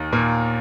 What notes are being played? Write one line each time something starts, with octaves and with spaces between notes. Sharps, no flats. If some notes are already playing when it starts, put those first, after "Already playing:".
Already playing: D#2 D#3
A#2 A#3